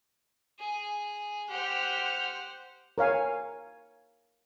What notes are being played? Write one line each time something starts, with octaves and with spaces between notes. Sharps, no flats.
G#4
G4 C5 F#5 F6
A#4 C#5 F5 G#5